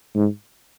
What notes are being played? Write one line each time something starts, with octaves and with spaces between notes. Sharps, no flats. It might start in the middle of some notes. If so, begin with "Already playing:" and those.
G#2